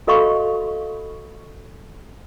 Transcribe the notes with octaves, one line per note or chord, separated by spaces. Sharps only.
F#4 A4 D#5 F5 B5 C#6